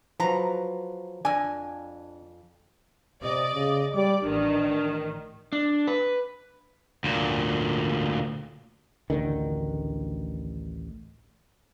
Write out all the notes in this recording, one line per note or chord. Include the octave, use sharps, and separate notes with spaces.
F3 F#3 B4 A#5
F2 D4 G#5
C3 D5 D#5
C#3
G3 D5 D6
A1 D#3 D4
D4
B4
D2 A#2
A1 D2 D3 D#3